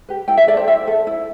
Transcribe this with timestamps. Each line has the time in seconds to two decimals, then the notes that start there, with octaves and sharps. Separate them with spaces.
0.09 G4 B4
0.28 E4 G5
0.37 E5
0.47 A4 D5
0.57 C5
0.68 E4 E5
0.87 A4
1.07 E4